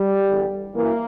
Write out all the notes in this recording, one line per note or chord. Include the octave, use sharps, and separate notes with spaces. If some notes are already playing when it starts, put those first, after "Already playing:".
Already playing: G3
E2 D3
F#2 E3 A#3